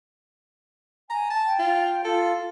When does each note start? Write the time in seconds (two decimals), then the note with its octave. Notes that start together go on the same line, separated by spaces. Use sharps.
1.10 G#5 A#5
1.30 A5
1.44 G5
1.59 F4
2.04 F4 A4